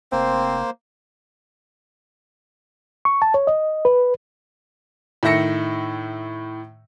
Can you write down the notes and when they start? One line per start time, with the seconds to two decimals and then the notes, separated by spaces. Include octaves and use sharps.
0.12 F1 A#3 C4 C5
3.05 C#6
3.22 A5
3.34 C#5
3.47 D#5
3.85 B4
5.23 A2 D#3 E5 A#6 C#7